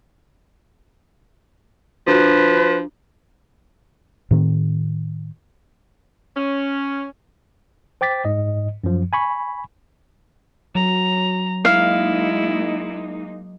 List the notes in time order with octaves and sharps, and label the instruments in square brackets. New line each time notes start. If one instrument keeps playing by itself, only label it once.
[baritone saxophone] F3 [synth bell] D4 F#4 [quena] B4
[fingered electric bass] A2 D#3 C4
[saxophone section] C#4
[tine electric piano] C5 G5 D6 A6 B6
G#2 D#5
F#2 F3
G#5 B5 C#6
[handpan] F#3 [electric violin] A#5
[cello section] G#3 A#3 D#4 [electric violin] E4 [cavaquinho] F5